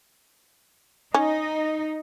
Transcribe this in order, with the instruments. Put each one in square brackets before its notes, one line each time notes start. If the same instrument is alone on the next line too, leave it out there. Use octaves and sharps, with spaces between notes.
[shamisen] C#4 [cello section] D#4